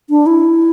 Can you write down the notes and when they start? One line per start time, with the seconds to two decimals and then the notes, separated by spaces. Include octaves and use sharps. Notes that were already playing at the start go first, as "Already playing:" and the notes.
0.10 D4
0.26 E4